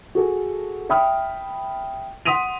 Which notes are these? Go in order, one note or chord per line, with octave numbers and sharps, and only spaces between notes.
F#4 G#4 A4
E5 G5 B5 D#6 F6
F#5 C6 D#6 B6 D#7 F7